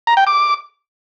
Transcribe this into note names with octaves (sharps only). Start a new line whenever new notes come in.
A#5
G5
D6